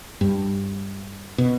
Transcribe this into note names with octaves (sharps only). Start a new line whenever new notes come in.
G2
B2